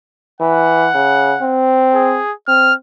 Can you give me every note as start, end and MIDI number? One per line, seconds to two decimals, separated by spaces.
0.41 0.88 52
0.41 1.65 78
0.95 1.34 49
1.42 2.20 60
1.95 2.33 68
2.48 2.73 60
2.48 2.74 89